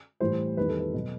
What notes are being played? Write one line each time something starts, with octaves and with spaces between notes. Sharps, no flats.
A2 E3 G3 C5
E2 D#3 G3 B4
A4
B4
B2 F#3